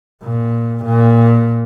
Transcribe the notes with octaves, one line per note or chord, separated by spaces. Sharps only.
A#2
A#2